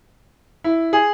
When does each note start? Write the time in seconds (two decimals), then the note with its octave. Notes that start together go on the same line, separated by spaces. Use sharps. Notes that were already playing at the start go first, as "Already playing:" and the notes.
0.64 E4
0.93 G#4